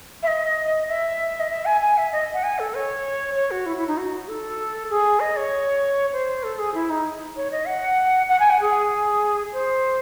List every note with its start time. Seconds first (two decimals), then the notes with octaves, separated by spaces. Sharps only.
0.23 E5
0.28 D#5
0.88 E5
1.40 D#5
1.50 E5
1.66 G#5
1.81 G#5
1.98 E5
2.12 D#5
2.34 F#5
2.44 G#5
2.59 A4
2.75 C#5
3.36 C#5
3.51 F#4
3.66 E4
3.77 E4
3.88 D#4
3.98 F#4
4.28 A4
4.90 G#4
5.20 D#5
5.37 C#5
6.13 C5
6.43 A4
6.59 G#4
6.74 E4
6.90 D#4
7.37 C#5
7.52 D#5
7.67 F#5
8.29 F#5
8.40 G#5
8.50 F#5
8.60 G#4
9.53 C5